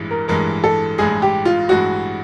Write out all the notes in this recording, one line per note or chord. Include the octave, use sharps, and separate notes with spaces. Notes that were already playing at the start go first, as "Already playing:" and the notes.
Already playing: A1 G2 E3 G#3
A#4
A1 G2 E3 G#3 A#4
A4
A1 G2 E3 G#3 G#4
G4
F4
A1 G2 E3 G#3 F#4